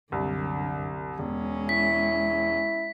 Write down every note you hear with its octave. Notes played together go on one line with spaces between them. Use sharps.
C2 F#2 D3
E1 G#3 C#4
E4 B6